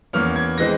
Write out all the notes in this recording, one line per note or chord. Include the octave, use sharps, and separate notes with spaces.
E2 E3 A#3 C#4 F6
G#6
E3 G#3 C4 A#6